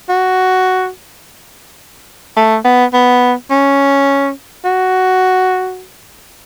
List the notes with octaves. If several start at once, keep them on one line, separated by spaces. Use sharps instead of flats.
F#4
A3
B3
B3
C#4
F#4